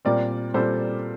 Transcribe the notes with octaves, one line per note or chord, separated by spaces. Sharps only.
A#2 G3 C4 A#4 D5
A#2 G3 C4 A4 C5